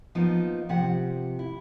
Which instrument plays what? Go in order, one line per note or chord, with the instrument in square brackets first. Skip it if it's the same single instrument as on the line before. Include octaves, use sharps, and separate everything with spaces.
[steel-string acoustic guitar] F3 A#3 B3 D#4
C3 F3 F#5
E4